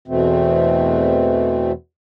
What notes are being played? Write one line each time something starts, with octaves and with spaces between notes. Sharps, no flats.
E2 B2 E3 A3 C4